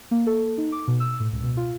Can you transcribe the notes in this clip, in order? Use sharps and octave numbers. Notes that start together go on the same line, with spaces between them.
A#3
A4
D#4
D6
B2
E6
A2
C#2
B2
F4